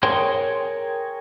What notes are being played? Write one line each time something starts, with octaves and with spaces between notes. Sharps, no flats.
G#4 A#4 C#5 G5 C6